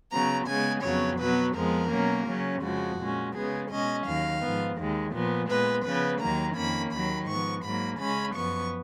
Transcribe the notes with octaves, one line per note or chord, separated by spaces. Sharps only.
C#3 F#3 B3 A#5
C#3 G#3 B3 G#5
F2 C#3 F#3 B3 C#5
B2 F#3 B3 B4
F2 F3 G#3 B3 A#4
B2 F#3 A#3 C#4
C#3 F#3 C#4
F2 C#3 F3 G#3 F#4
A#2 G#3 C#4
C#3 G#3 B3 G#4
B2 G#3 C#4 D#5
D#2 D#3 F#3 F5
G#2 F3 B3
D#2 D#3 G#3
A#2 F3 B3
A#2 G#3 B3 B4
C#3 F3 B3 B4
D#2 D#3 F#3 A#3 A#5
F2 D#3 A#3 C#4 B5
D#2 D#3 F#3 B5
G#2 F3 B3 C#6
G#2 F#3 A#3 B5
C#3 G#3 C#4 B5
F#2 F3 B3 C#6